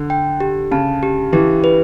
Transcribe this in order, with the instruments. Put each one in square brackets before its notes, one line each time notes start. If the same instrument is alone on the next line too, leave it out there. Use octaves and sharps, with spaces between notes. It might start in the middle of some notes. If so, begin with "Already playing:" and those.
Already playing: [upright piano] D3
[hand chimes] G5
G4
[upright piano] C#3 [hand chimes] A5
[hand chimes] G4
[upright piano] E3 [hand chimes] G4
[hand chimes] B4